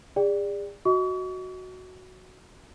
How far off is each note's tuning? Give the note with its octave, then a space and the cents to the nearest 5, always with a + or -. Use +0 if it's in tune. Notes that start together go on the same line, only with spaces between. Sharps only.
G#4 -40 D5 +0 G5 +0
F#4 +0 D#5 +20 C#6 +40